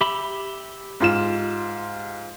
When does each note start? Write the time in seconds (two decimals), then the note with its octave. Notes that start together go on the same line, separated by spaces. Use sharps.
0.01 G4 E5 B5
1.00 G#2 F4 E7